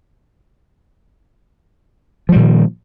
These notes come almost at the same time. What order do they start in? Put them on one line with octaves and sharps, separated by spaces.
F3 G3 A#2 D#3